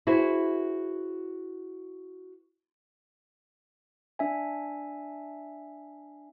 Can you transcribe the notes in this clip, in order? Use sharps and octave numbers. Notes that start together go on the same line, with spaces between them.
E4 F#4 G#4 B4 C5
D4 E5 G#5